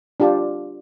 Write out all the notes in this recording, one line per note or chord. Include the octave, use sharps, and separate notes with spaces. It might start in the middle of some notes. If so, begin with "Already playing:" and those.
D4 F4 G4 A5